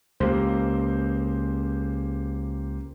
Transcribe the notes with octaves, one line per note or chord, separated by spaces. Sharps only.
C#2 A#3 G4 C5